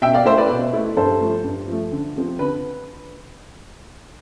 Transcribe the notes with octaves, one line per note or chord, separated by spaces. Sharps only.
B2 E5 G5
D5 F5
A3 E4 C5 E5
B4 D5
B2
A3 E4
G2 A4 C5
F3 A3
G2
F3 A3
D3
F3 C4
D3 B4